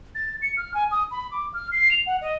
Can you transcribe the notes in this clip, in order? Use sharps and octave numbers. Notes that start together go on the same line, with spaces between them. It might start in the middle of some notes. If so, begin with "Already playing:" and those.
A6
C#7
F6
G#5
D#6
B5
D6
F6
C7
F7
F#5
D#5